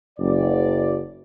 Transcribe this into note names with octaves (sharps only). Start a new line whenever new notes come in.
F#1 D5